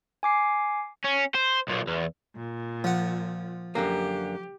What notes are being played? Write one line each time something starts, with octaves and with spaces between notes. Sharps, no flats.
G#5 D6 C7
C#4
C5
B1 A#2
E2
A#2
F3 F#5
F#2 D3 A#3 G4